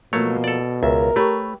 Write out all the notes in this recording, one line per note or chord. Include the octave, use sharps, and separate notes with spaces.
B2 F3 F#3 A3 A#3 C#5
A4 D5
C#2 A#4 E5
A3 G4 B4 C#5